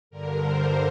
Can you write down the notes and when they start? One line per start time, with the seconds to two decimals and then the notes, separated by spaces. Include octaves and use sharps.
0.10 G2 D3 A#4
0.40 C5